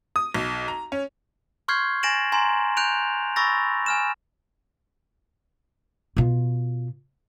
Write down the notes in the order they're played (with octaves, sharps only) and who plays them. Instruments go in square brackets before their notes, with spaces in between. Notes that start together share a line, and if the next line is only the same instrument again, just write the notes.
[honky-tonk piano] D#6
B1
A#5
C#4
[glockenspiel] C6 C#6 F6 G6 G#6 C7
G#5 A6 A#6 D7 E7 F#7
G#5 A#5 C6
F#6 G6 D7 F7
B5 C#6 E6 A6 A#6
G#5 F6 E7
[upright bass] B2 F4